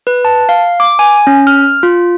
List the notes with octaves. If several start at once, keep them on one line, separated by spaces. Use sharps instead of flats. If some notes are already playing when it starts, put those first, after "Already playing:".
B4
A5
F5
D6
G#5
C#4
F6
F4